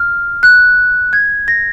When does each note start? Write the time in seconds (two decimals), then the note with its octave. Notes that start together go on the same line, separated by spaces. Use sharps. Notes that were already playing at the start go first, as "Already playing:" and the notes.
Already playing: F6
0.43 F#6
1.13 G#6
1.48 A#6